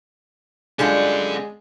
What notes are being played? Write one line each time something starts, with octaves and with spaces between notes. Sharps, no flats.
D3 G3 G#3 C#4 F4 F#5 G#5